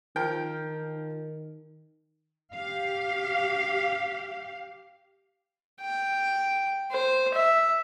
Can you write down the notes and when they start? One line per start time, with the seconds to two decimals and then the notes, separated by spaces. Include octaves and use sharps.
0.16 D#3 F3 A#4 G5
2.54 G4 F5
5.81 G5
6.91 C5
7.34 E5